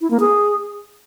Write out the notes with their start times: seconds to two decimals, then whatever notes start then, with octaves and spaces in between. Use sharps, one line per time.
0.01 E4
0.11 A#3
0.20 G#4